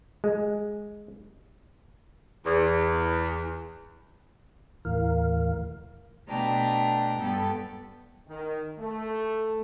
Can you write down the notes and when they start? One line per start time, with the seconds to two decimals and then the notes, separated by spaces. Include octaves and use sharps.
0.24 G#3
2.46 E2
4.85 D#2 A2 E3 A#4 F5
6.29 B2 A3 D4 G5 A5 A#5
7.20 G2 B3 A4 G5
8.29 D#3
8.80 A3